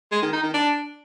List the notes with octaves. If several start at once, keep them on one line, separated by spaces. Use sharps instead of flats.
G#3
D#3
D#4
D#3
D4